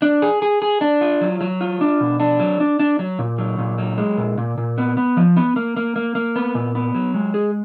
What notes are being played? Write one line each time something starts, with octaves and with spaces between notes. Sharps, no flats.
D4
G#4
G#4
G#4
D4
F4
F#3
F#3
F4
D4
B2
D4
F#3
D4
D4
F#3
A#2
F#3
A#2
F#3
G#3
A#2
A#2
A#2
B3
B3
F3
B3
A#3
A#3
A#3
A#3
B3
A#2
B3
F#3
G#3
G#4